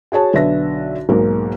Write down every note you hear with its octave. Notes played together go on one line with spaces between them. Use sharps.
F#4 G#4 C#5 A5
B1 D3 B4 E5 A#6
B1 G#2 G#3 A#3 A#4